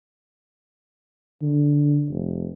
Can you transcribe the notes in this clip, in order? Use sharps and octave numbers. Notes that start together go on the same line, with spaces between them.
D3
F1